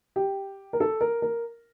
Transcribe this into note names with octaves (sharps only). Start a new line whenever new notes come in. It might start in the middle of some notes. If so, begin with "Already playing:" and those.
G4
A#4
A4
A#4
A#4